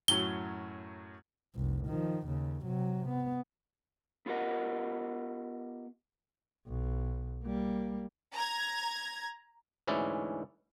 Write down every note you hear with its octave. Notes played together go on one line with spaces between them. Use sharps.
F#2 A2 F#3 G7
F1 C2
D#3 F3
D#2 C#3
C3 F#3
B3
B3 F4 G4 A#4 D#5 F#5
B1
G3 A#3
A#5 G#6
D2 G#2 E3 C#4 E4 D5